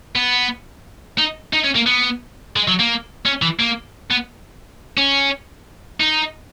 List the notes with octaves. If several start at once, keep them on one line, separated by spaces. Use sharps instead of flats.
B3
D#4
D#4
C#4
A#3
B3
G#3
F#3
A#3
C#4
E3
A#3
B3
C#4
D#4